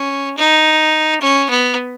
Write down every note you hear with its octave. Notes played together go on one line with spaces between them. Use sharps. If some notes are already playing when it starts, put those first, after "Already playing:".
Already playing: C#4
D#4
C#4
B3